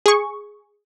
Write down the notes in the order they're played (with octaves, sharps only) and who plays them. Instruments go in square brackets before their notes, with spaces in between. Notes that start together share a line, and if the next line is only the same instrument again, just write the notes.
[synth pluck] G#4 C#6